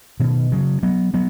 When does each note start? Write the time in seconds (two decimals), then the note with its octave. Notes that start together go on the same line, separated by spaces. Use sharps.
0.20 B2 D#3
0.52 C#3 F#3
0.83 F#3 B3
1.14 F#3 B3